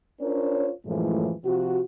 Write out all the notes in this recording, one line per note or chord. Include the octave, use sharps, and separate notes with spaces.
C#4 D4 F4 A#4 C5 C#5
F#2 A2 E3 F3 G#3 A3
C3 F3 F4 F#4